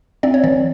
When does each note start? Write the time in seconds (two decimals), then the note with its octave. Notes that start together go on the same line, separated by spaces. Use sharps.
0.23 C4 D5
0.34 C#5
0.44 E3 D5